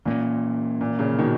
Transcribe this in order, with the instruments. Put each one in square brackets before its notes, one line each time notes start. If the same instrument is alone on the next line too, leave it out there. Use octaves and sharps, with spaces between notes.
[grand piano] A#2 [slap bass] E3 A#3 C#4
[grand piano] A#2
A#2 C#3
B2 D#3